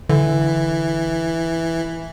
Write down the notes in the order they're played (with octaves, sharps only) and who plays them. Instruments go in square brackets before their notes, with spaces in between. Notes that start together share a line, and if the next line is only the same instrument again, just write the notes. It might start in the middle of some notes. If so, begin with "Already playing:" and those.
[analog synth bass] D3 [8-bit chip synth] E3